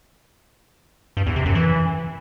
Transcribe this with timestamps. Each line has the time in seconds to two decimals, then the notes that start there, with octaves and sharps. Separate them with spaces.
1.17 G2
1.26 E2
1.36 C3
1.46 F#2
1.55 E3